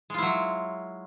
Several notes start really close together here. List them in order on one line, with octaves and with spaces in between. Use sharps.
G#3 F4 E4 F#3